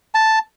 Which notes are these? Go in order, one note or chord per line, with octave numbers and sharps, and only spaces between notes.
A5